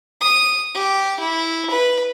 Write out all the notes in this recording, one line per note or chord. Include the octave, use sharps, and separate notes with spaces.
D#6
G4
E4
B4